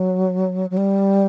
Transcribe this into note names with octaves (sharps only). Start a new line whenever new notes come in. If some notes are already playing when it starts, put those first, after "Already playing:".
Already playing: F#3
F#3
G3